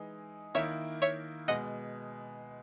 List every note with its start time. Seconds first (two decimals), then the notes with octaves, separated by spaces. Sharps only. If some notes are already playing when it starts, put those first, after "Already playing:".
Already playing: E3 G#3 D#4
0.54 D#3 A#3 E4 C#5 E5
1.02 C#5 E5
1.48 B2 G#3 D#5 F#5